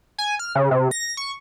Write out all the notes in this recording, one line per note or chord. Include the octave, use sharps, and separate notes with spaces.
G#5
F6
C#3
C3
A#6
C#6